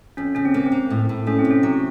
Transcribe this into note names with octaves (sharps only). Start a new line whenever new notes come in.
F2 C#4
C#3 C#4
C4
A#3
C4
A#3
A2
A2
A3 C#4
C4
C3
C#4
F#3 C4